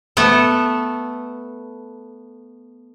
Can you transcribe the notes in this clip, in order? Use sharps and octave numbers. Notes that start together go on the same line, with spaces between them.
A3 B3 A4